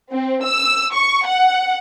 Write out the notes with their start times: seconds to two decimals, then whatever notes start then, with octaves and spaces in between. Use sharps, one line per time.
0.13 C4
0.44 E6
0.94 C#6
1.27 F#5